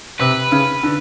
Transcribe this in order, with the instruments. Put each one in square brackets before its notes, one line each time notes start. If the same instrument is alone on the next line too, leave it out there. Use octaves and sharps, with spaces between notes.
[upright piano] C3 [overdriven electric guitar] B4
[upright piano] C#3
D3